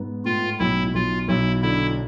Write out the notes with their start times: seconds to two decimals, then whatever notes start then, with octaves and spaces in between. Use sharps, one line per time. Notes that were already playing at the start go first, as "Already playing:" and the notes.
Already playing: G#2 B3
0.25 A2 F4
0.59 B1 E4
0.94 B1 F4
1.28 B1 E4
1.62 D3 E4